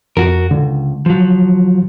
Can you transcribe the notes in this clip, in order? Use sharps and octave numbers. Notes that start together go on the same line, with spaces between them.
F2 F#4 A#4
C#2 D3
F3 F#3